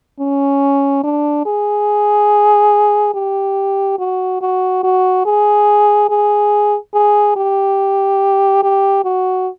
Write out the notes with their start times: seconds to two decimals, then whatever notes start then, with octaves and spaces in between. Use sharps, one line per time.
0.20 C#4
1.04 D4
1.46 G#4
3.14 G4
3.99 F#4
4.41 F#4
4.83 F#4
5.26 G#4
6.09 G#4
6.94 G#4
7.36 G4
8.63 G4
9.05 F#4